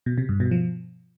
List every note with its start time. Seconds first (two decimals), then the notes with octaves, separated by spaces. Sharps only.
0.06 B2
0.18 C3
0.29 G2
0.40 B2
0.51 F3